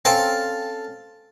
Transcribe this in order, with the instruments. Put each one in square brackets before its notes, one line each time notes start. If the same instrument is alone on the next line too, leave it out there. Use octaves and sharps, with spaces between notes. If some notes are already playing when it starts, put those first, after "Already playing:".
[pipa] C4 C#4 [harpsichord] A4 F5